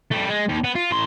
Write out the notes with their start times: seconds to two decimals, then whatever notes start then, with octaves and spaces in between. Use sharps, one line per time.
0.12 G3 A3
0.29 G#3
0.49 D#2
0.64 B3
0.75 F4
0.91 A2 C6